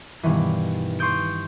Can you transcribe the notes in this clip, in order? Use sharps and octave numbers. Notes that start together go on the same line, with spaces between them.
G2 B2 D#3 E3
C6 C#6 D#6 G6 D7